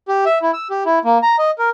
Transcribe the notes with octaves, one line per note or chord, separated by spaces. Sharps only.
G4
E5
E4
E6
G4
E4
A#3
A#5
D#5
A#4